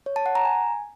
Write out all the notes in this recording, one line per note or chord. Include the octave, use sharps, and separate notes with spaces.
C#5
A5
F#5
A#5
G#5